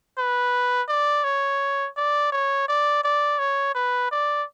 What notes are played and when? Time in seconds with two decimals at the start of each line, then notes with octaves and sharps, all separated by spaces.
0.18 B4
0.88 D5
1.24 C#5
1.96 D5
2.32 C#5
2.68 D5
3.04 D5
3.39 C#5
3.75 B4
4.11 D5